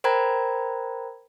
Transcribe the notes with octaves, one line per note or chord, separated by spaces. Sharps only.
A#4 C5 G5 A#5 B5 G#6